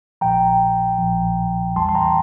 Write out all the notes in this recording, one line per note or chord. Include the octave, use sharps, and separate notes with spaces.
A#1 A#2 F3 G5 A#5
A#1 A#2 F3
E2 E3 G3 A5 C6
C6
G5 A#5